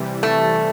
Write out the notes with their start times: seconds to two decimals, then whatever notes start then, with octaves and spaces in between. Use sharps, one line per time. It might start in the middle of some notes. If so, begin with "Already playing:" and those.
Already playing: C3 E3 G3
0.23 A3